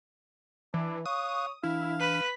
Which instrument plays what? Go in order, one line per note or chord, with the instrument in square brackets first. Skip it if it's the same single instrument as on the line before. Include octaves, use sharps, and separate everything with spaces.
[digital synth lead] E3 [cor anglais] D4
[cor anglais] C#5 [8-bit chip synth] F5 C#6 F#6 [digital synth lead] D#6
[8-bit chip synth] E3 D4 [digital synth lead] E4 [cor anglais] F5
[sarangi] B4 [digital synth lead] B6